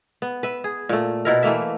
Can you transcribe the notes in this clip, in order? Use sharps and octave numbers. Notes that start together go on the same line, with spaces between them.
B3
B4 E5
G#4
A#2 A3
B2 E4 A#4
E3 A3 A#3 E5